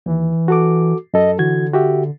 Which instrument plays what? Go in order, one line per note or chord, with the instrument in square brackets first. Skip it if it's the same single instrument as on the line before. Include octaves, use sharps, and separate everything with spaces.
[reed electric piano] D#2 [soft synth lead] E3
[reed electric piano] F#4 A4 D6
[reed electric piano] F#2 A4 [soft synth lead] D#5
[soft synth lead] D3 [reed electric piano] E3 F#4 G#6
[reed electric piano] F#4 G4 E5